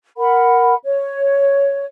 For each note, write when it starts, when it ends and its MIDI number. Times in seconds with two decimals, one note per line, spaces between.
0.18 0.74 70
0.18 0.74 78
0.18 0.74 83
0.84 1.85 73